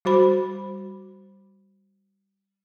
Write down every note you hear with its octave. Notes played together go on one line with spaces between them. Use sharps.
G3 F#4 C5 B5